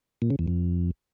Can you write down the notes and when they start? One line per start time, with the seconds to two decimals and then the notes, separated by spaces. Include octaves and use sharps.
0.22 A#2
0.30 C#3
0.39 E2
0.48 F2